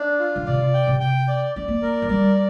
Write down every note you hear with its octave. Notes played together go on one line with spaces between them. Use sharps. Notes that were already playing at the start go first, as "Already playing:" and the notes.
Already playing: D4
F4
D3
C3 D5
G5
C3
G5
D5
C4 D5
A#3
A#4
F3
G3 D5